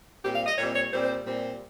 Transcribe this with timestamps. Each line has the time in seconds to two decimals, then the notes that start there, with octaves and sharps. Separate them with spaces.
0.23 A#2 G3 C4 G4
0.35 F5
0.46 D#5
0.57 A#2 G3 C4 C#5
0.74 C#5
0.91 A#2 G3 C4 C5
1.03 C5
1.25 A#2 G3 C4